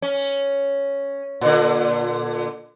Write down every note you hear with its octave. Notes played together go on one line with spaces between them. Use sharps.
C#4
A#2 D3